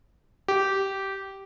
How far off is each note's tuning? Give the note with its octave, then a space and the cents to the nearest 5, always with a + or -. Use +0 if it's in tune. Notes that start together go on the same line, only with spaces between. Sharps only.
G4 -15